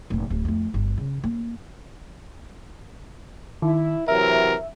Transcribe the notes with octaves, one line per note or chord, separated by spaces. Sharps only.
F1 A#2
D1
F2 A3
G1
C#3
A#3
D#3 E4
C3 E3 F#3 A#4 E5